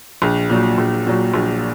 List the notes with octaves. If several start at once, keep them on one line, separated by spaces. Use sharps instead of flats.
A#1
A#2 F#3
A#1
A#2 F#3
A#1